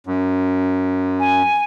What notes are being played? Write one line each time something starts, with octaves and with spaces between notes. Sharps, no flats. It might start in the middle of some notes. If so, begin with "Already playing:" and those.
F#2
G#5